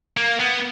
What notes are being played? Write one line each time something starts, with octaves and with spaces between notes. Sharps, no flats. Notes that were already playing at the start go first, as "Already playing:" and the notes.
A#3
B3